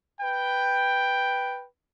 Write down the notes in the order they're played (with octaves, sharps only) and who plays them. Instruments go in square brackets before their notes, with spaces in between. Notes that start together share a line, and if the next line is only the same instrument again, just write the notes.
[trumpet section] B4 G5